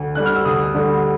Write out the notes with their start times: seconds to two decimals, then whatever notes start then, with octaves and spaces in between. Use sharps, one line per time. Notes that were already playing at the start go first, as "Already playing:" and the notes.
Already playing: D2
0.15 D3 G3 F#6
0.26 F6
0.35 E6
0.45 D2 D#6
0.75 D3 G3